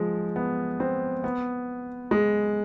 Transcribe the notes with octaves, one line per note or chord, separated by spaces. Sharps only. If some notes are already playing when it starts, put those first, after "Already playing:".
Already playing: F3 G#3
B3
C4
B3
G#3